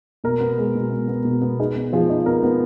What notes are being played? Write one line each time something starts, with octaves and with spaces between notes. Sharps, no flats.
B2 A#4
B3
G#3
B2
B3
B3
B2
B3
D#4 G#4
B3
F3 G#4
D#4
B3 A#4
B3